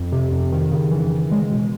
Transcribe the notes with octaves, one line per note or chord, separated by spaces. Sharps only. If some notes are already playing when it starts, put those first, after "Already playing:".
Already playing: F2
C3
F2
D#3
C#3
E3
C#3
G#3
B2